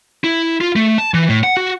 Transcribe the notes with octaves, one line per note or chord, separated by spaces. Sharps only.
E4
F4
A3
A5
E3
A2
F#5
F#4